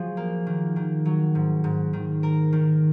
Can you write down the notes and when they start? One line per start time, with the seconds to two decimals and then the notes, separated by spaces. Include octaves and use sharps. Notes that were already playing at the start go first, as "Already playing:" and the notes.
Already playing: F3 F#3 G#4
0.17 A#3
0.46 D#3
0.76 D#3
1.05 F#3
1.35 G#2
1.64 G#2
1.93 D#3
2.23 A#4
2.53 D#3